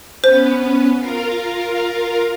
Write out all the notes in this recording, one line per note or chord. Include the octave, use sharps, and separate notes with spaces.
B3 C#4 B4 C5
F4 A#4 F5